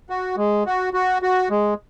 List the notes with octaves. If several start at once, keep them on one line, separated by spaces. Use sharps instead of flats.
F#4
G#3
F#4
F#4
F#4
G#3